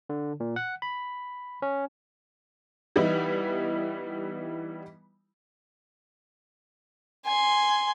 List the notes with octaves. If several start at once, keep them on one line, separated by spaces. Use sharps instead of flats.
D3
A#2
F#5
B5
C#4
E3 G3 B3 D#4 E4
G#5 C6